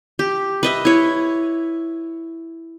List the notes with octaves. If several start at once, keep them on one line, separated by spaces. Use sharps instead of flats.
G4
B4 D#5 E5
E4 C#5